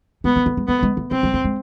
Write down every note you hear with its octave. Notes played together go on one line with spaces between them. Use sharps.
G#3 B3
A3
A3
G#3
A3 B3
G#3
A3
G#3 C4
G#3
A3
G#3